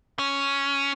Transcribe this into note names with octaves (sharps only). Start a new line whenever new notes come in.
C#4